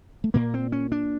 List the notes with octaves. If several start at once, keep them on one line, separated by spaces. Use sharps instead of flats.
A3
A#2 A#3
C4
C#4
D4